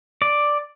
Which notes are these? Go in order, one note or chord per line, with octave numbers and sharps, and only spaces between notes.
D5